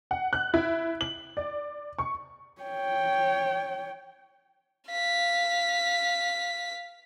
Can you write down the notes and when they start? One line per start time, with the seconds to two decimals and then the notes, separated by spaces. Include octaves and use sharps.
0.11 F#5
0.33 F#6
0.54 E4
1.01 F#7
1.37 D5
1.99 C#6
2.62 C#5 G5
4.89 F5 B6